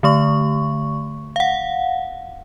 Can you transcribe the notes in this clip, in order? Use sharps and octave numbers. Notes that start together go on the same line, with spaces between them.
D3 A3 C#6
F5 F#5